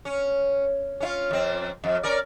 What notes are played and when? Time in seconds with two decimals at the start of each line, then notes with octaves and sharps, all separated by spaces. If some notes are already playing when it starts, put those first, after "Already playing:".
0.05 C#4
1.00 C#4 E4 F4
1.31 F2 C4
1.84 F2
2.03 C#4 A#4 D5